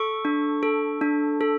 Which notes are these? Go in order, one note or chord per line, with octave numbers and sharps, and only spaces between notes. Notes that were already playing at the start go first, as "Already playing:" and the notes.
Already playing: A4 C#6
D4
A4
D4
A4